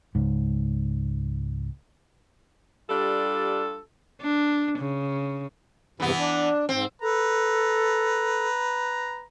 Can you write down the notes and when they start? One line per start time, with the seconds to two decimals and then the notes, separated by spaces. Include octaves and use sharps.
0.15 C#2 G#2
2.90 G3 D4 F4 G4 A4
4.21 D4
4.78 C#3
6.00 E2 G2 C3 E3 B3
6.18 D4
6.69 G#2 C4
7.02 A4 B4 A#5